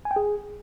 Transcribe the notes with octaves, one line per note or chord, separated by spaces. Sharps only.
G#5
G5
G#4